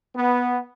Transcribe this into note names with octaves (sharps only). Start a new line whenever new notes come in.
B3